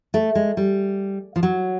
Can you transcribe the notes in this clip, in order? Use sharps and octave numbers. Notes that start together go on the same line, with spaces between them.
A3
G#3
G3
F3
F#3